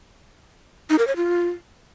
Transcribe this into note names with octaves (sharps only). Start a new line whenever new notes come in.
D#4
A#4
C#5
F4